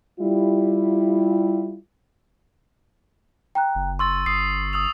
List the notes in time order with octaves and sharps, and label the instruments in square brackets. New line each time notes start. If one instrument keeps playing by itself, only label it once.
[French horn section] G3 E4 F4
[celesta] G5 A#5 F#6
[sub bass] F#1
[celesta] C6 [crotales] C#6 E6 A6
[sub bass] G1 [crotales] D#6 C7
[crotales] D#6 E6 F7